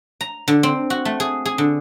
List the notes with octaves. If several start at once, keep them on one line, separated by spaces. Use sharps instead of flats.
A#5
D3
C4
F#4
A3
G#4
G#4
D3